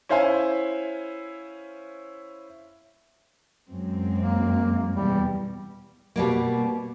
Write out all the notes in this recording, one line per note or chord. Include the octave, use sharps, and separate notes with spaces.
C#4 E4 C5 E5 F5 G#5
F#2 G#3 C4
A#3
E2 B2 G3
B2 G3 A#3